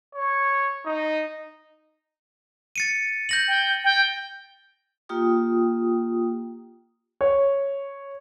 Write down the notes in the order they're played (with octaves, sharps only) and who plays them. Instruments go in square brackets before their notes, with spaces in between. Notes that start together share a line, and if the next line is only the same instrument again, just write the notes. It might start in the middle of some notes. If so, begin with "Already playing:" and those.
[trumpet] C#5
D#4
[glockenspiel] A6 C#7 D#7
G6 A#6 F#7
[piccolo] G5
G5
[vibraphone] A#3 F4 G4 G5 D#6
[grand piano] C#5